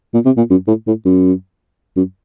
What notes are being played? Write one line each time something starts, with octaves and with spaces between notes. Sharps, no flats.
A#2
C3
A#2
F#2
A2
A2
F#2
F#2